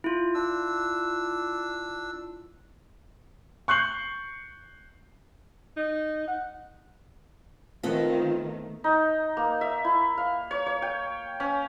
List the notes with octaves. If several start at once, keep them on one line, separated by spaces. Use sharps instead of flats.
E4 F4
D4 E6
C#6 F#6 G6 C7 F#7
D#4
F#5
D#3 A3 B3 C4 F4 A4
D#4
A#3
E5
E4
F5
C#5
C#5
G5
C#4